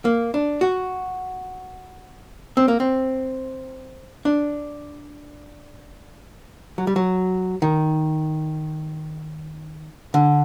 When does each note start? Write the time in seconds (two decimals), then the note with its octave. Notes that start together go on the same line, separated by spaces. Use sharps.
0.05 A#3
0.34 D4
0.61 F#4
2.57 C4
2.68 A#3
2.80 C4
4.25 D4
6.78 F#3
6.87 G3
6.96 F#3
7.62 D#3
10.14 D3